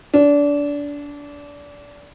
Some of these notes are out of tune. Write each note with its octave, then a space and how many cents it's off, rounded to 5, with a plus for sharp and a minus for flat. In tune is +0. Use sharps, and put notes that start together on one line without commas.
D4 -25